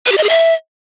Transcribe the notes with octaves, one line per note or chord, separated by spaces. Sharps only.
B4
G4
D#5
G#4
E5